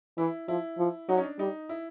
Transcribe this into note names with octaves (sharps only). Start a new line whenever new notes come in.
E3 E4
F3 E4
F3
F#3 D#4
C#4
D4
G3 D#4
E4